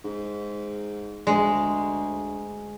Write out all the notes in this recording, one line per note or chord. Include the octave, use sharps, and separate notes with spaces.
G#2
D2 G#3